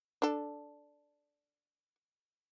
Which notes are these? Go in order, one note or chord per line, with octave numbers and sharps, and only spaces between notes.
D4 A4